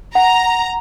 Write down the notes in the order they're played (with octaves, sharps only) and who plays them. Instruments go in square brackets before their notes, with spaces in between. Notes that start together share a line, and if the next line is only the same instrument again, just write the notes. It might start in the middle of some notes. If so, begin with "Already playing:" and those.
[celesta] F#5 [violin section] A#5